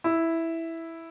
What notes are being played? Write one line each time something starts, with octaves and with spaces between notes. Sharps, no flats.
E4